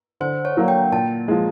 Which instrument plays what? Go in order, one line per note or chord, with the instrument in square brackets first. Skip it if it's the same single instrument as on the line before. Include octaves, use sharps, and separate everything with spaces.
[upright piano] D3 [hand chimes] C5
[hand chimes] C#5
[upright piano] F#3 A#3
[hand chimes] G5
[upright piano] A#2 [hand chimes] A5
[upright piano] F3 G#3